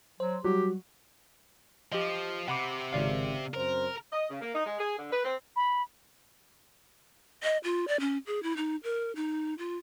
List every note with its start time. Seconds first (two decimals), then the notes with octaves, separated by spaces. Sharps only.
0.20 F#3 C5
0.44 F#3 G3 G4
1.92 F3 G4 D#5
2.48 C3 F#5 B5 D6
2.93 G#1 C#3 D5 F5
3.54 F#2 C4 A#4 C5
4.12 D#5
4.29 C#3
4.41 A#3
4.54 D#4
4.66 G#3
4.78 G#4
4.98 D3
5.11 B4
5.24 C4
5.56 B5
7.43 D#5
7.64 F4
7.88 D5
8.00 C#4
8.27 G#4
8.43 E4
8.57 D#4
8.84 A#4
9.16 D#4
9.58 F4